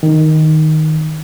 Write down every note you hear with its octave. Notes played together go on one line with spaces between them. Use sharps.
D#3